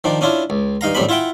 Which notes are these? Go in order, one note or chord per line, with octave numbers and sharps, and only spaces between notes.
D#3 F3 D4
C#4 D4 E4 F4
C#2
G2 D#4 F5 A#5
A1 F#2 G3 C4 D4 B5
E4 F4 E5 F#5 G5